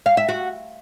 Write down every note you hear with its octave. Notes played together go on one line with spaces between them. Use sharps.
F5
E5
F#4